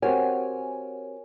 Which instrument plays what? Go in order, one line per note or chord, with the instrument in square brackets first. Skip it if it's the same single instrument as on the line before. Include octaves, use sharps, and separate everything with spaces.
[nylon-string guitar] C4 F#4 G4 [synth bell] A#4 C#5 G#5